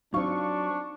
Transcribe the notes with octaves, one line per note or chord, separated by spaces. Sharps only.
F#3 C4 D4 D#4 F4 F5 C#6